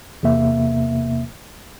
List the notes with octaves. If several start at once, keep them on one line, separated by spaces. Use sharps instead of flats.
E2 C3 A#3 E5